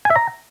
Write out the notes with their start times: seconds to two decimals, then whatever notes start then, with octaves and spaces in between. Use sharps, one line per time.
0.05 G#5
0.10 E5
0.16 A#5